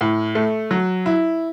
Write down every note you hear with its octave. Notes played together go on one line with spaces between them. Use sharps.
A2
A3
F#3
E4